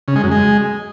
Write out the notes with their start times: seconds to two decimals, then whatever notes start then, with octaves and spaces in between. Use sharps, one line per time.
0.08 C#3
0.16 G#3
0.24 F#2
0.31 G#3